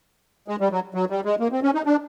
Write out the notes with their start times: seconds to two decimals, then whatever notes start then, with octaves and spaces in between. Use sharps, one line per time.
0.48 G#3
0.60 G3
0.72 F#3
0.94 F#3
1.10 G3
1.25 G#3
1.40 A#3
1.52 C4
1.63 C#4
1.74 D#4
1.86 D4